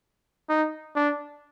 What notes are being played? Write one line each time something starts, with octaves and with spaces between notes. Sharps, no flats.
D#4
D4